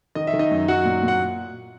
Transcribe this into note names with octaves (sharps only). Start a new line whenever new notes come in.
D#3 D#5
E5
D#3
D#4 D#5
F#2
F#3 F#4 F#5
A#2
A#2 F#5